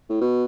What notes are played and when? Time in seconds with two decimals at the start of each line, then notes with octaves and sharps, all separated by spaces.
0.10 A2
0.21 B2